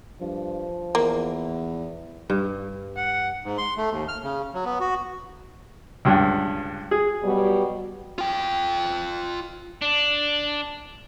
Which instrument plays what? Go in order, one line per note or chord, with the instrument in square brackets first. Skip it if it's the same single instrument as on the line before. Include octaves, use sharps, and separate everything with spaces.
[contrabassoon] G2 [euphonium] F3
[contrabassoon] E2 [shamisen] A#3
[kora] G2
[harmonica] F#5
[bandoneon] G#2
C6
A3
D#2
F6
C#3
F#3
B3
F#4
[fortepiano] C#2 G2
G#4
[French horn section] B2 F#3 G3
[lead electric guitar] F4 G5
[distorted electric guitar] D4